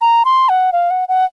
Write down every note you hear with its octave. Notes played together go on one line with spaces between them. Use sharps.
A#5
C6
F#5
F5
F#5
F#5